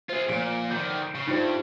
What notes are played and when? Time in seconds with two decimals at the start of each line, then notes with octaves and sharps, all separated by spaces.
0.10 F4 G#4 C5
0.29 A#2 F3 D7
0.70 D3 D#3 G6
1.15 C#3
1.28 G2 D#4 F4 C5